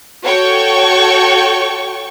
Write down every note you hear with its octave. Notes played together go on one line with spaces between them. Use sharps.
F#4 A4 C#5 G5 C#6